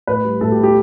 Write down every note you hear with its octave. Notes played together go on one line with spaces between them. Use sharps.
A2 B4
G3
A2 A4
G4
B3
G4